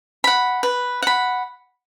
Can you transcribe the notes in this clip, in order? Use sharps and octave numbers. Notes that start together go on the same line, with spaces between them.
F#5 B5
B4
F#5 B5